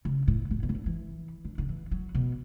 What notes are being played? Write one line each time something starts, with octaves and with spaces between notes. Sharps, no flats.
C#3
A2
A2
B2
C#3
D3
E3
D3
D3
E3
F#3
B2